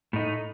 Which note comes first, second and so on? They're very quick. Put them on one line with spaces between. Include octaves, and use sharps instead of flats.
A2 D#4 A3